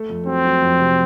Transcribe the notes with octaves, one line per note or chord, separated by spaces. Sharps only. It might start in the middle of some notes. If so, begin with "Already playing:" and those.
Already playing: A3
F2
F#3 C4
F#3
F2
C3